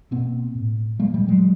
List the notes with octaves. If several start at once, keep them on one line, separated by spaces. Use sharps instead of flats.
B2 A#3 C4
A2
A#2 G#3 A#3
G3 A3
F#3 G#3